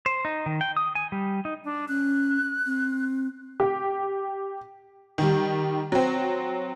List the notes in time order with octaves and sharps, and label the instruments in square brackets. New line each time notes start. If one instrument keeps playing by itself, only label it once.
[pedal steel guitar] C5
D#4
D#3
G5
D#6
G#5
G3
D#4
[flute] D4
[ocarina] C#4 [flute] F#6
[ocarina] C4
[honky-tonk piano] G4
D#3 G3
F#3 C4